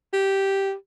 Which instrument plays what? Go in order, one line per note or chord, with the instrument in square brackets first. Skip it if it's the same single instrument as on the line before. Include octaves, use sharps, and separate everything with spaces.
[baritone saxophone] G4